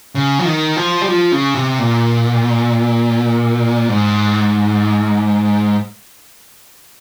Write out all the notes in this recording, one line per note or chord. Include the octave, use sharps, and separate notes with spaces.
C#3
F3
D#3
F3
G3
F3
C#3
C3
A#2
G#2